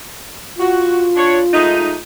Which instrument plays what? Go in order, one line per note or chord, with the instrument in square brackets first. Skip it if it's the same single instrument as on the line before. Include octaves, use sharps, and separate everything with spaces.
[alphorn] F4 [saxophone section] F#4
[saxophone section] D4 C#5
G#3 A3 D#4